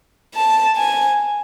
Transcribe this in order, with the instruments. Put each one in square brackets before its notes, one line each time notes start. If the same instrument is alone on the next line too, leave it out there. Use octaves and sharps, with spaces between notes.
[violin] A5
G#5